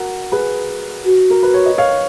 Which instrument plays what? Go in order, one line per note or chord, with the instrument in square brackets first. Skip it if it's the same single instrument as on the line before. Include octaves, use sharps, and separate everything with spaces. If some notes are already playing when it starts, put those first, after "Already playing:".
Already playing: [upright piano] F#4 A#4
G#4 B4
[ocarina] F#4
[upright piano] A#4
B4
C#5
D#5
C#5 F5